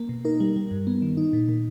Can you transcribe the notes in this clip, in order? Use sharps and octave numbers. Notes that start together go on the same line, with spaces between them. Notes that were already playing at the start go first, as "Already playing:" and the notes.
Already playing: A#3
B2
D#4 A#4
G3
G3
G2
B3
D#3
D#4
A#2
A#2